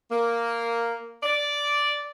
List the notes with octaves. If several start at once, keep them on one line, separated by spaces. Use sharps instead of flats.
A#3
D5